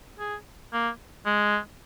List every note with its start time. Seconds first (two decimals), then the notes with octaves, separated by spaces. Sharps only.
0.19 G#4
0.73 A#3
1.26 G#3